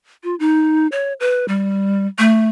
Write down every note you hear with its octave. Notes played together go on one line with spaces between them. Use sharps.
F4
D#4
C#5
B4
G3
A3